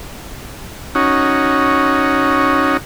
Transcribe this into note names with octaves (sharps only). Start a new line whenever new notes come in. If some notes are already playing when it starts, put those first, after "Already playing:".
C#4 D#4 F#4